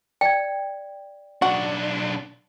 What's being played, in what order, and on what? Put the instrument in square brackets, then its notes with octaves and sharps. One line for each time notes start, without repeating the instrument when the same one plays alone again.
[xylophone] D5 G#6 [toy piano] G5
[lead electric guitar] B1 D4 [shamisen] F#4